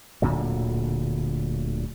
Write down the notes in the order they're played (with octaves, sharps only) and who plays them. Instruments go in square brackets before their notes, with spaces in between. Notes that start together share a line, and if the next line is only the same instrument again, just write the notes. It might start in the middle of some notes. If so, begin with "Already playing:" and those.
[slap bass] D1 A#2 D3 F#3